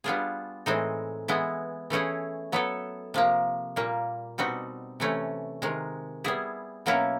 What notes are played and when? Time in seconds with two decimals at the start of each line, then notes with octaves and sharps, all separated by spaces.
0.04 G3 B3 D4 F4 G#4
0.66 A2 E3 G#3 C4 D#4
1.28 E3 G#3 B3 E4
1.90 E3 A3 C#4 E4 G#4
2.52 F#3 B3 E4 A4
3.14 C3 F3 A#3
3.76 A#2 G3 A#3
4.38 B2 G3 C4 D#4 F#4
5.00 C3 E3 A3 C#4
5.62 C3 D#3 G#3
6.24 G3 B3 E4 G#4
6.86 B2 F#3 A#3 C#4 E4